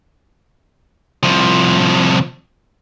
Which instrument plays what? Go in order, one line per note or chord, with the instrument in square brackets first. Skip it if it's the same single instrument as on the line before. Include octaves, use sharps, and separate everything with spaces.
[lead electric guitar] C2 F3